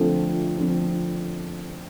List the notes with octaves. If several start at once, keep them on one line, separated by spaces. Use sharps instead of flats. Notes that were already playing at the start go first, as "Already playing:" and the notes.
Already playing: D3 F3 A3 C4
D3 F3 A3 C4